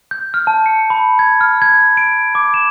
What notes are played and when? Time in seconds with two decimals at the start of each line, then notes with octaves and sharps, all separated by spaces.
0.11 G6
0.34 F6
0.47 A5
0.66 C#7
0.90 B5
1.19 G#6
1.41 F6
1.62 G#6
1.97 D7
2.35 D6
2.54 E7